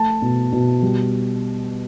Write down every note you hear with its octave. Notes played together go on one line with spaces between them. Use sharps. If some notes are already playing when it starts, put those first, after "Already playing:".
Already playing: A3 A5
B2
B2
G3